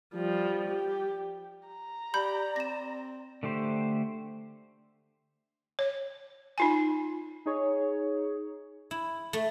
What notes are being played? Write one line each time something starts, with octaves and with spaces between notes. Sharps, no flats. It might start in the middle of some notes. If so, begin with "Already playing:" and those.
F3 G3
G4
A#5
G4 D5 B5 G6
C4 A#6 E7
D3 A3 G4 C5
C#5
D#4 F4 G#5
D#4 G#4 C#5
E4
A3